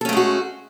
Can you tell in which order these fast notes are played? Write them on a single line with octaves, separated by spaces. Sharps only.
A4 C#4 A3 G#3 F#4